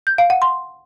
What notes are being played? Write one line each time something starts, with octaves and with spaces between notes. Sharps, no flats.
G6
F5
F#5
C6